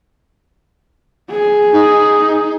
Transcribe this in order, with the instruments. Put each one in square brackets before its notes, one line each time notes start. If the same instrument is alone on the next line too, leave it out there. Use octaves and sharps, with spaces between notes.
[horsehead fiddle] G#4
[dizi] D#4